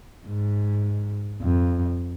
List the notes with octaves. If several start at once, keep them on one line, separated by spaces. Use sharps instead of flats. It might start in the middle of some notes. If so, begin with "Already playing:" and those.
G#2
F2